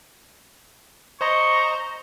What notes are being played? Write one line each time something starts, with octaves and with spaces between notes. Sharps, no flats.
C5 D#5 A#5 C#6